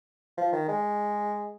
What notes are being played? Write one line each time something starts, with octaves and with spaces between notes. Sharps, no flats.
F3
D#3
G#3